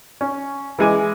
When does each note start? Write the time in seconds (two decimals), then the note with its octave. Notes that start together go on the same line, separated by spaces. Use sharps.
0.21 C#4
0.79 E3 G#3 G#5 D6